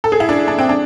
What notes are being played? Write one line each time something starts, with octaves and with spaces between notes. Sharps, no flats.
A4
G#4
E4
D4
D4
C4
D4